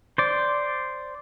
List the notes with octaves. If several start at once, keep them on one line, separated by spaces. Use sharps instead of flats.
C5 D5